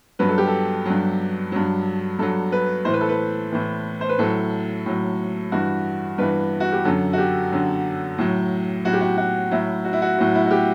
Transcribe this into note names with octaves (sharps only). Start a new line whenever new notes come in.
G2 F#3 B4
A4
G4
A4
G2 F#3
G2 F#3
G2 F#3 A4
B4
A2 E3 C5
B4
A4
B4
A2 E3
C5
B4
A2 F#3 A4
A2 F#3
G2 E3 F#4
G2 E3 B4
F#4
G4
F#2 D3 F#3 A4
F#4
G4
F#2 D3 F#3
A2 F#3
A2 F#3 F#4
G4
F#4
F#4
A2 F#3 E4
F#4
E4
F#4
A2 F#3
E4
F#4
G4